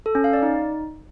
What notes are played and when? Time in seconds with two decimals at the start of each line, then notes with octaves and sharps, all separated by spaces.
0.06 A4
0.15 C#4
0.24 F5
0.33 D5
0.43 D#4